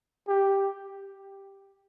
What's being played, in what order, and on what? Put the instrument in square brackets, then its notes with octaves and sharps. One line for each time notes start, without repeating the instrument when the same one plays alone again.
[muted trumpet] G4